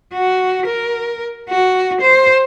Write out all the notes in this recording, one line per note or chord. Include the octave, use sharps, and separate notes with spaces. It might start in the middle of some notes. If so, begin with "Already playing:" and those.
F#4
A#4
F#4
C5